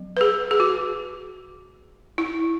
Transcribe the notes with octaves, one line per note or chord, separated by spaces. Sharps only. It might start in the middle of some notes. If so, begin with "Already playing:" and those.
Already playing: F#3 B3
B4
G#4
G#4
F#4
E4